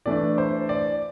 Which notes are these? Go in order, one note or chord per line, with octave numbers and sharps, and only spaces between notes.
E3 A3 D4 D5
C5
D5